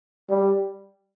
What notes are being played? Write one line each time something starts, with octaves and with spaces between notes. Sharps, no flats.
G3